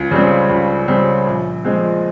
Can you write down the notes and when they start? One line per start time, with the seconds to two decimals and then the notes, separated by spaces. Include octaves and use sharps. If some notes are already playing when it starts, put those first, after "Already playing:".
Already playing: C#2
0.11 C#3 G3 C4
0.50 C#2
0.88 C#3 G3 C4
1.27 A#1
1.65 A#2 F3 G#3 C4